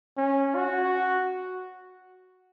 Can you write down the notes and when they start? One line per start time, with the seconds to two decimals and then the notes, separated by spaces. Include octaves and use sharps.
0.17 C#4
0.55 F#4